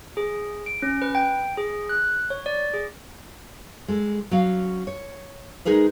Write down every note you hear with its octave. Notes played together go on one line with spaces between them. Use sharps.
G#4
D7
C#4
B4
G5
G#4
F#6
C#5
D5
G#4
G#3 A4
F#3 C#4 F5
C#5
G#3 D#4 G#4 A#4 B4